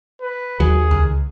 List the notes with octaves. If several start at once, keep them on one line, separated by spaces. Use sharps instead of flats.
B4
D#2 F#3 G#4
C#2